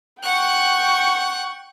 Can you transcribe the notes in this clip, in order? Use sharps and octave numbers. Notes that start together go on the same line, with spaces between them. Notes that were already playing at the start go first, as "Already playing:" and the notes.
F#5 G5 C#6 F#6